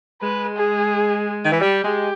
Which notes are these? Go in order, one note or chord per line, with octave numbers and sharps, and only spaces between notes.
G#3 B4
G#4
D#3
E3
G3 G4
G#3